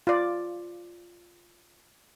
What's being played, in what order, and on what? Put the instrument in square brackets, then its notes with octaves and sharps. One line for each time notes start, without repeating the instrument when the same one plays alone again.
[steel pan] F4 D5